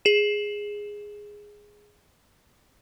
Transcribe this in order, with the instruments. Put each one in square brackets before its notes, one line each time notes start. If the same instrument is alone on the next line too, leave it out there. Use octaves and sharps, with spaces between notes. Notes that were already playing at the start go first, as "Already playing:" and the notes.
[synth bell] G#4 E7